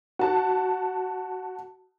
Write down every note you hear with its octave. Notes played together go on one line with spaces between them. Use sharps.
F#4 A5